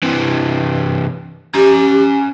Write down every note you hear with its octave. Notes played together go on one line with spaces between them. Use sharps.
C3 E3
C#4 G4 A#5